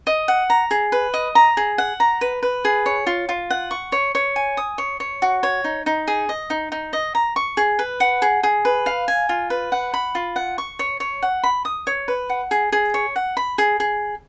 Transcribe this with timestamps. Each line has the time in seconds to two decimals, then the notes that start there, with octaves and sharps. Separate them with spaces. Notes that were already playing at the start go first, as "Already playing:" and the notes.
0.07 D#5
0.28 F#5
0.50 A#5
0.71 G#4
0.92 B4
1.14 D#5
1.35 A#5
1.57 G#4
1.78 F#5
2.00 A#5
2.21 B4
2.43 B4
2.65 G#4
2.86 C#5
3.07 F4
3.29 F4
3.50 F#5
3.71 C#6
3.92 C#5
4.15 C#5
4.36 G#5
4.57 D#6
4.78 C#5
5.00 C#5
5.22 F#4
5.43 C#5
5.64 D#4
5.86 D#4
6.08 G#4
6.29 D#5
6.50 D#4
6.72 D#4
6.93 D#5
7.15 A#5
7.36 C#6
7.57 G#4
7.79 B4
8.00 F#5
8.22 G#4
8.43 G#4
8.65 B4
8.86 F5
9.08 G#5
9.29 F4
9.50 B4
9.72 F#5
9.94 B5
10.15 F4
10.36 F#5
10.58 C#6
10.79 C#5
11.00 C#5
11.22 F#5
11.44 B5
11.65 D#6
11.87 C#5
12.08 B4
12.30 F#5
12.51 G#4
12.72 G#4
12.94 C#5
13.16 F#5
13.37 B5
13.58 G#4
13.80 G#4